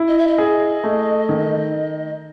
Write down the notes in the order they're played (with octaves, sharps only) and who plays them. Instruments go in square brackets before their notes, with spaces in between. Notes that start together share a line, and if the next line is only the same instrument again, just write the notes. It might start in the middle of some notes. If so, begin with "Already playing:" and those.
Already playing: [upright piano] E4
[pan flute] D#5
E5
D#5
[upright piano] G#4
A3
D#3